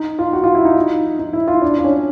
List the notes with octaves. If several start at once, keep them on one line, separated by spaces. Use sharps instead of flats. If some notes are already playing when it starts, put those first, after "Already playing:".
Already playing: D#4
F4
F#4
F4
E4
D#4
D#4
E4
F4
D4
D4
C#4